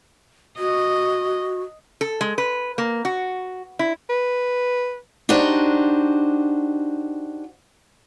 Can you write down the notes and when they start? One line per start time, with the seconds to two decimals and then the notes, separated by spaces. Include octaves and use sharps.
0.58 F#4 D#5
2.01 A4
2.21 G#3
2.38 B4
2.78 A#3
3.05 F#4
3.79 E4
4.09 B4
5.29 D4 D#4 F#4 G4 C5